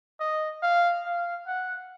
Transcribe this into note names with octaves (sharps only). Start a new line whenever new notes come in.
D#5
F5
F5
F#5